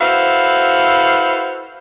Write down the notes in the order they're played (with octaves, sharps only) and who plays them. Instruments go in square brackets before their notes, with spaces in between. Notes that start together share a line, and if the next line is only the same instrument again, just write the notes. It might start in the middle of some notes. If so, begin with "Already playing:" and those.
[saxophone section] E4 F#4 A4 B4 C5 F5